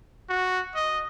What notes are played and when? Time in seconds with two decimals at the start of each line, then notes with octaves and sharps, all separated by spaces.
0.30 F#4
0.75 D#5